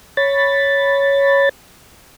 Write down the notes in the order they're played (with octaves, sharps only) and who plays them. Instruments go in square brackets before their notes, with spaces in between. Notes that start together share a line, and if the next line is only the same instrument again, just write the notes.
[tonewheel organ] C#5 B5 A6